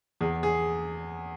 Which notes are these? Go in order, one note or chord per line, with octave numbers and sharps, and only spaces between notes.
E2 G#4
G#4